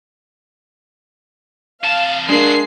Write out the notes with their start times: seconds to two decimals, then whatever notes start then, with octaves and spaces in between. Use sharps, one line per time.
1.84 C3 F5 A5
2.29 A#2 G#3 A#3 D4 F#4 C7